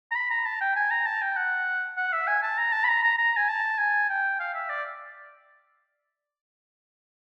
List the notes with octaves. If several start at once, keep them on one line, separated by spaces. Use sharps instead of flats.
A#5
B5
A#5
A5
G5
G#5
A#5
A5
G5
F#5
F#5
E5
G#5
A5
A#5
A5
B5
A#5
A#5
A#5
G#5
A5
G#5
G5
F5
E5
D5